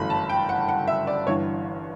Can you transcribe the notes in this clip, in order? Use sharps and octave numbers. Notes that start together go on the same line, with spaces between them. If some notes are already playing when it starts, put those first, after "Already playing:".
Already playing: G1 F#2 E3 A3 B5
A5
G5
F#5
F#5
E5
D5
G1 G2 E3 C#5